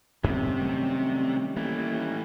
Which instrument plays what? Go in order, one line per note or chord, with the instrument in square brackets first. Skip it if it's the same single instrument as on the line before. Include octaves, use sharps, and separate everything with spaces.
[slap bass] F#2 A2 B3 [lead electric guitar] C3 [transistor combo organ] D#3 G3 C#4
[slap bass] F#3 A3
[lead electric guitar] E3 A3 [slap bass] A#3